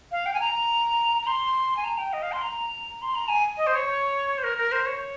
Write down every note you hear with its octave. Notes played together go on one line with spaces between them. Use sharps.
F5
G5
G#5
A#5
A#5
C6
G#5
A#5
G5
D#5
F5
C6
A#5
C6
A#5
G#5
D#5
C5
C#5
C5
A#4
A#4
C5
C#5